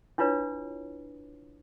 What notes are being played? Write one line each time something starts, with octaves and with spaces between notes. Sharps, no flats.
D4 E4 F4 B4 C#5